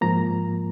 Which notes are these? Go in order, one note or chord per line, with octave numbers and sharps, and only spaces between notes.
G#2 F3 A#3 A#5